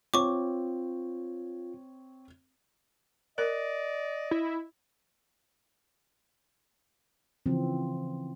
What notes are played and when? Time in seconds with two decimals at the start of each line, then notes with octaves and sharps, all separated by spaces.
0.14 C4 F4 C#5 C#6 D6
3.38 A#4 D5 D#5
4.31 E4
7.46 C#3 E3 F3 C4